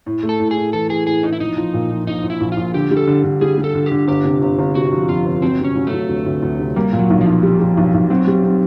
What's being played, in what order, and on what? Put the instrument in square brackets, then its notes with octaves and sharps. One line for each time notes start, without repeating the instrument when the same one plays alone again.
[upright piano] A2
A3
[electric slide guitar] A4
[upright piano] A2
[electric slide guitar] G#4
[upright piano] A2
[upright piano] E3 [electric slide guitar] A4
[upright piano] E3 [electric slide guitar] G#4
[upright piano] A2 [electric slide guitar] G#4
[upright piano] A2 [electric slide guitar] D#4
[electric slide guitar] E4
[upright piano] A#1 [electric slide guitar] D#4
[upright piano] F3
A#2
F3
[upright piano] A#1 [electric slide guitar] D#4
[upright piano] A#1
[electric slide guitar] E4
[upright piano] A#1
[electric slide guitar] F4
[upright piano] A#1
[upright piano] D3 [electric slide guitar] G4
[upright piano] G3
[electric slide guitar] A4
[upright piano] D3
D3
[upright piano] G3 [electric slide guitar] G#4
[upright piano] G3
[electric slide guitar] A4
[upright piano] D3
[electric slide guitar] G4
[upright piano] D3
[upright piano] G1 [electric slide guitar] G4
[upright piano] C3
G1
G1
[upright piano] C3 [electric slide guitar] F#4
[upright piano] F3
[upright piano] F2 [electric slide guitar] F4
[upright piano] G1
[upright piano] F#3 [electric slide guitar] C4
[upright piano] C3
[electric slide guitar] C#4
[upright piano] F#3
[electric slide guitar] A3
[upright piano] F#3
D2
D2
D2
C3
[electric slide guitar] G3 [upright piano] A#3
[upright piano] A#2
[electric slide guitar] F#3
[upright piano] B1
[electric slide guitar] F3
[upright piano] B1
G3
G3
B1
B1
[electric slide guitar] F#3 [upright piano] C4
[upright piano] G3
C4